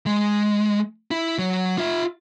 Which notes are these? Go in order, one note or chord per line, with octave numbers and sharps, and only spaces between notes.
G#3
E4
F#3
F4 E5